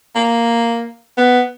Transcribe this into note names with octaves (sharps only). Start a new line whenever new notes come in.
A#3
B3